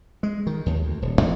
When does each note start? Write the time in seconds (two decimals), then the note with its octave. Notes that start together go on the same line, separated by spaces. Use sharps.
0.23 G#3
0.47 D#3
0.66 D#2
0.84 D2
1.02 D#1
1.21 E2